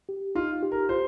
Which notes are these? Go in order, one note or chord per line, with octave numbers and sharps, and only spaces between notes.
G4
D#4 F4
G4
A#4
F4 C5